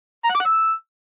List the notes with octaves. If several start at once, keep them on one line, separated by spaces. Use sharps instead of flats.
A#5
F#5
D6
F#5
E6